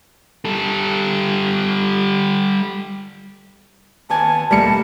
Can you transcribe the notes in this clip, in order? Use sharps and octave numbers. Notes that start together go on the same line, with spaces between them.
G3 A4
D#2 B3 G#5 A5
B1 G3 A3 A#3 A5 C#7